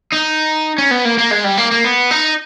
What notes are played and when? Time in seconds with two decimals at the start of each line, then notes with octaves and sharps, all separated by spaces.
0.13 D#4
0.78 C#4
0.91 B3
1.05 A#3
1.19 A#3
1.31 G#3
1.44 G3
1.57 A#3
1.71 A#3
1.84 B3
2.11 D#4